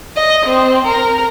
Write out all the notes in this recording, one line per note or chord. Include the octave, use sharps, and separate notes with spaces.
D#5
C4
A#4